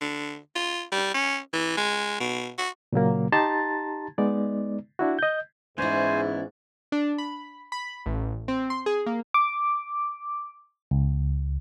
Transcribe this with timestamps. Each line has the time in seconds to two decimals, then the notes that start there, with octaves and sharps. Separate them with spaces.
0.01 D3
0.55 F4
0.92 G3
1.14 C#4
1.53 E3
1.77 G#3
2.20 B2
2.58 F#4
2.93 A#2 C#3 F#3 A#3
3.32 D#4 G4 A5 A#5 C6 A6
4.18 G#3 B3 D#4 D5
4.99 D4 E4 F#4
5.19 D#5 G6
5.78 G#2 E3 B3 C#4 E4 C5 D5 G#5
6.92 D4
7.18 B5
7.72 B5
8.06 A1
8.48 C4
8.70 C6
8.86 G#4
9.06 A#3
9.34 D6
10.91 C#2